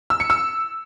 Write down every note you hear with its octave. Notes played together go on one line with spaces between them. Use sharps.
E6
C#7
E6